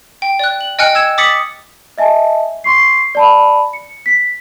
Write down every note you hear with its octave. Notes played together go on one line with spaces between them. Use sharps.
G5
D5 F#6
F#7
D#5 G5 G#5 F6 F#6 C#7
E6 G#6 E7
D6 D#6 A6 B6 C#7 F#7
D#5 E5 G#5 A5
C6 C#6 C7
D5 A5 B5
C#7
B6